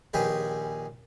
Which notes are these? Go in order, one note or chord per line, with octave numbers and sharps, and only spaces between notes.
A#1 D#3 C#4 G4 G#4 B4